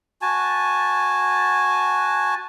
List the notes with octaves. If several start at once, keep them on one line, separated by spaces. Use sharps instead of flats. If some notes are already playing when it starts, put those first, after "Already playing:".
F#4 G#5 A5